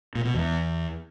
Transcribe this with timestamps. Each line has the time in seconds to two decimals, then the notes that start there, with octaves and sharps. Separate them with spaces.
0.15 A#2
0.25 B2
0.34 E2